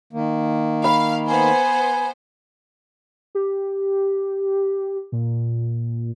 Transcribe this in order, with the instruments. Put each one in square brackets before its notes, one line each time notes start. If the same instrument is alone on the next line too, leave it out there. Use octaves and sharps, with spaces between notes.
[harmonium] D#3 A#3
[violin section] F5 [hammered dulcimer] B5
[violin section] B3 C5 [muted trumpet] G#5
[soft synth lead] G4
A#2